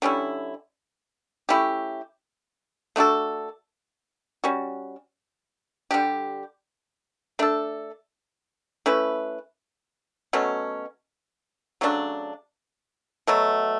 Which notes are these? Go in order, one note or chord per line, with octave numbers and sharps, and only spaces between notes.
D3 G3 C#4 E4
A3 C#4 E4 G4
A3 D4 F#4 A4
G3 C#4 F#4
D3 G3 D4 G4
A3 D4 A4
A3 C#4 E4 B4
B2 F#3 A3 C#4
C#3 F#3 A3 D4
B2 F#3 A3